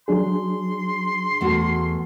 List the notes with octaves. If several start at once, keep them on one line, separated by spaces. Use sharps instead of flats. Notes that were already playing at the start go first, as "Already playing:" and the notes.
F#3 D4 G#4 C6
E2 A3 F#4